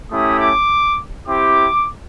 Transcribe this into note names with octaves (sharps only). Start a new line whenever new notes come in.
A3 C#4 E4 G4 D#6
D6
C4 E4 G4 D6